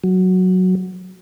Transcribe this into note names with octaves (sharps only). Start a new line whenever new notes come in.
F#3